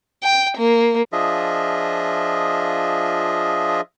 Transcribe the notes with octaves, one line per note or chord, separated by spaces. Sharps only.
G5
A#3
F3 D4 F4 G#4 D#5 E5